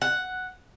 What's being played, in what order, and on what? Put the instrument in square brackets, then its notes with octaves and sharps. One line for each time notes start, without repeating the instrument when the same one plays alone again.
[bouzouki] F#5